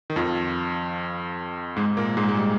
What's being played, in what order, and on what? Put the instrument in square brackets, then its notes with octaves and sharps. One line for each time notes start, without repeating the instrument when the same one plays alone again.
[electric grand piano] D#3
F2 F3
G#2 G#3
A#2 A#3
G#2 G#3
G#3
G3